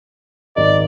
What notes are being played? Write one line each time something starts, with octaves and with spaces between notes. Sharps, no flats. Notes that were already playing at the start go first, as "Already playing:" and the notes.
G#1 A#4 D5 D#5